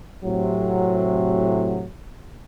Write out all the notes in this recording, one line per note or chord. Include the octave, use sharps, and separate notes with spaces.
A2 C3 F#3